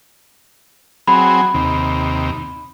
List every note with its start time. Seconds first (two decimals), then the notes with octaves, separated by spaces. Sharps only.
1.07 F#3 C4 G#4 B5
1.54 D#2 C3